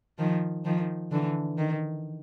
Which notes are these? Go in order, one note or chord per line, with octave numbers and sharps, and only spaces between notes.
D#3 F3
D#3 F3
D3 E3
D#3